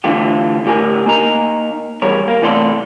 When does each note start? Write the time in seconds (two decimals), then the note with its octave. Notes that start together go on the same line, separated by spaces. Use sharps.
0.04 D3 E3 A3 F4 G4
0.65 D2 A2 G4 A#4 G#5
1.06 A#3 D#4 A#5
2.02 E2 G3 G#4 A#4 C#5
2.28 A#3
2.42 C3 E3 A3 A4 D5 C6